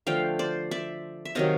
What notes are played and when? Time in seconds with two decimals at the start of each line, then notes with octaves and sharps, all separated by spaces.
0.07 D3 F3 A3 F5 G5
0.39 C5 D5
0.71 D5 E5
1.25 E5
1.35 C3 D#3 F#3 D#5 F5